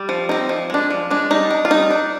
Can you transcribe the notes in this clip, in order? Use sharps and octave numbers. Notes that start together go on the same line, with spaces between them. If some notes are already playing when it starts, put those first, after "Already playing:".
Already playing: G3
F3
C4 D#4
F3
G#3 D4
F3
G#3 D4
G3 D#4
D4
F4
G3 D#4
D4